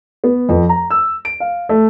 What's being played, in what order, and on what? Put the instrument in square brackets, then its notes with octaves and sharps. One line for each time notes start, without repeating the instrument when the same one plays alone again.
[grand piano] B3
F2
A#5
E6
D7
F5
A3